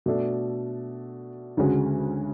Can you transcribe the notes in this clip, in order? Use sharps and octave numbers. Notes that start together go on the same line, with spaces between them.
B2 A3 D4 A4
D2 C#3 G#3 C#4 F#4